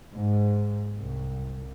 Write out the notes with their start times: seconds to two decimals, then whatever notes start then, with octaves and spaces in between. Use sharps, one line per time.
0.16 G#2
0.96 C2